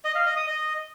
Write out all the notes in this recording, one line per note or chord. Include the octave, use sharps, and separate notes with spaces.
D#5
F5
D#5
D#6
D#5